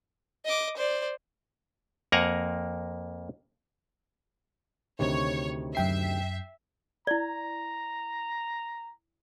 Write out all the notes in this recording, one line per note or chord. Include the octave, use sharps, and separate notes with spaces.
D#5 D6
C5 D5
F2 A#3 A#4 F#5 G#5 A#5
D2 C3 D#3 C#5
F#2 E5 G5 C7
E4 D5 A#5